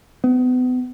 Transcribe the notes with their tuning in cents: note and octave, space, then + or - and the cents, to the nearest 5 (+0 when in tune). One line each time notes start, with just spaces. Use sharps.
B3 +35